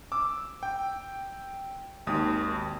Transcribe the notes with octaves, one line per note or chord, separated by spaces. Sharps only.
D6 E6
G5
G#1 D#2 D#6